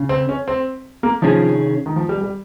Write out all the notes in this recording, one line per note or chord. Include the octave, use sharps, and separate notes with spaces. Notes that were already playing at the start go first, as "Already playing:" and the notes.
Already playing: C#3
C4
C#4
C4
A#3
C3 D#3 F3 C#4 G#4
D#3
F3
G3
G3